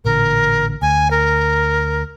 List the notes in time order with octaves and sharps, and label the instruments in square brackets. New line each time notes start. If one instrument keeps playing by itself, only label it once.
[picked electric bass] A1 A#2 D3 [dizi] A#4
[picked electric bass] D2 [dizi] G#5
[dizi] A#4